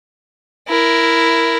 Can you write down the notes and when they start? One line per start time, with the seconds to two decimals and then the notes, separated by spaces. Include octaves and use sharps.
0.68 E4 A#4